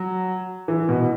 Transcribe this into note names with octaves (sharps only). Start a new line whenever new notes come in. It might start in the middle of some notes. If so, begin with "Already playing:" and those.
Already playing: F#3
E3
B2